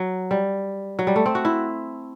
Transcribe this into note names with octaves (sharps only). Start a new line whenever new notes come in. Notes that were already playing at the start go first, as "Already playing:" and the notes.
Already playing: F#3
G3
F#3
G3
A3
C4
F#4
E4